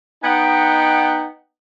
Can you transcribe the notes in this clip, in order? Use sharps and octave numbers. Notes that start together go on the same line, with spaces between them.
B3 D#4 D#5 F#5 G5